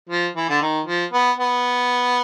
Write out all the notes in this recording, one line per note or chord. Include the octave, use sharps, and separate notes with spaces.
F3
E3
D3
D#3
F3
B3
B3